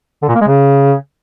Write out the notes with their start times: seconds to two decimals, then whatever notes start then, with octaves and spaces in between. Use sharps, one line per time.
0.22 D3
0.29 A#2
0.35 A#3
0.41 G#3
0.47 C#3